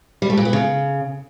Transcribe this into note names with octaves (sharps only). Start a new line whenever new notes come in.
G3
A3
A#2
B3
C#3